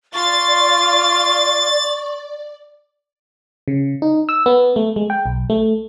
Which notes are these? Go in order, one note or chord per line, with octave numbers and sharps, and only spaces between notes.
F4 D5 C6 C#6 A6
C#3
D#4
E6
B3
A3
G#3
G5
B1
A3